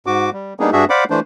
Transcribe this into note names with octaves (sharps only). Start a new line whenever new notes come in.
G#2 F#4 D6
G3
G3 A#3 B3 D4 D#4 G#4
G2 D4 F#4 G#4 E5
C5 D5 F5 F#5 B5 D6
E3 A3 D4 C5